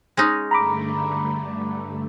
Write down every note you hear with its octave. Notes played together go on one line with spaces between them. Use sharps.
G#3 C#4 D#4
G2 D3 A3 A#5 B5 D6